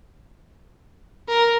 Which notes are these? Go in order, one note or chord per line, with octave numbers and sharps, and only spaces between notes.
A#4